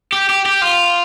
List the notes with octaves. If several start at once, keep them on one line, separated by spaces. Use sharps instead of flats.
G4
G4
G4
F4